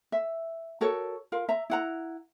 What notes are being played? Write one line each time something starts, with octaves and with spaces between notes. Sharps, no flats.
E5
F#4 A4 A#4 C#5
F4 A#4 F5
E5 A#5
E4 F#5 A#5